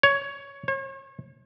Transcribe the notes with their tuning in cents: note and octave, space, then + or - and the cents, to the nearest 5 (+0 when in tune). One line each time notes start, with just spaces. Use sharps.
C#5 +10
C#5 -40